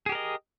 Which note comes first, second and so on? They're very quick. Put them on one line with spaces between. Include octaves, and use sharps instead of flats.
G#4 G4 A#4 D#5